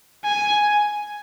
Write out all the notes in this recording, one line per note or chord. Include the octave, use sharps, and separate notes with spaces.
G#5